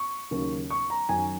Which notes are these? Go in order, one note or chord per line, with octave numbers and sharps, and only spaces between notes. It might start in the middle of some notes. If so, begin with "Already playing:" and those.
Already playing: C#6
D#2 C#3 F#3 A#3 C#4
C#6
A#5
F#2 D#3 F#3 G#5